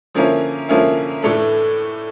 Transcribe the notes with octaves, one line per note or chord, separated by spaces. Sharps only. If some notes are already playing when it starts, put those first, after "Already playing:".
D3 F3 A#3 C#4 E4
D3 F3 A#3 C#4 E4
A2 E3 A3 D4